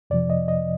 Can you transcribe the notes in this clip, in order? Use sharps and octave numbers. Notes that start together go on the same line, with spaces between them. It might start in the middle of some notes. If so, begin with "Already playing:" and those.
F2 C3 F3 D5
D#5
D#5